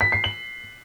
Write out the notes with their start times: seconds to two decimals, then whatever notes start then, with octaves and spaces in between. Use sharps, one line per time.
0.01 B6
0.12 C7
0.24 F#7